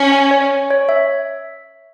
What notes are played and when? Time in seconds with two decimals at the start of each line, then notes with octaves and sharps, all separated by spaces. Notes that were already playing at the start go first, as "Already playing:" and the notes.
Already playing: C#4
0.12 G#5
0.31 C#5
0.51 C#5
0.70 C#5
0.89 E5